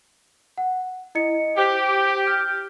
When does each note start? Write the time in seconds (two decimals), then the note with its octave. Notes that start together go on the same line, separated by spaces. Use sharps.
0.58 F#5
1.15 E4 D#5 C#7
1.57 G4 C5 G5
2.27 F6 G6